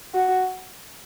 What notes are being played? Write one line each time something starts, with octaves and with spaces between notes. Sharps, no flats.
F#4